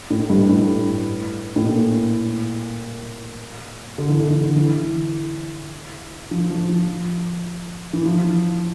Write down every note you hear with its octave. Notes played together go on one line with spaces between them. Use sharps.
A2
G2
A2
A2
A#2
D3
E3
D3
E3
D3
E3
F3
F3
F3
E3
F3